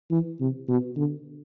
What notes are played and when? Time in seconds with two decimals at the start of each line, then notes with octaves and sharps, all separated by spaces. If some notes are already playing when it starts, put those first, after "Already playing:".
0.11 E3
0.40 C3
0.68 B2
0.96 D3